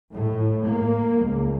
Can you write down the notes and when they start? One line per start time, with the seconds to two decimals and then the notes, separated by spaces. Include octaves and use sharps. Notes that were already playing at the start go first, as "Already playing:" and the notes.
0.13 A2
0.68 A#3
1.24 C#2